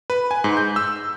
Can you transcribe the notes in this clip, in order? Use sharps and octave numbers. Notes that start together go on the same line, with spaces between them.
B4
G#5
G#2
G6
E6